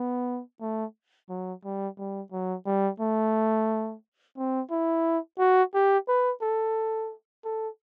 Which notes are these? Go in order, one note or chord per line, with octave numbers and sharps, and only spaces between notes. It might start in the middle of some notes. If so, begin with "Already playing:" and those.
Already playing: B3
A3
F#3
G3
G3
F#3
G3
A3
C4
E4
F#4
G4
B4
A4
A4